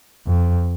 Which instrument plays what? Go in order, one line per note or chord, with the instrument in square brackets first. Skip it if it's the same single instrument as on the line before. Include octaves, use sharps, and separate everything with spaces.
[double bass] F2